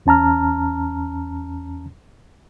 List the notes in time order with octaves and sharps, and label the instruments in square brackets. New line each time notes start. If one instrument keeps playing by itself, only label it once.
[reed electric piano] E2 C#4 A5 A#5 F6